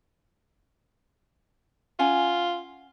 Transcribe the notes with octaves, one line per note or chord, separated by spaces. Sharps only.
C#4 F4 F#5 G#5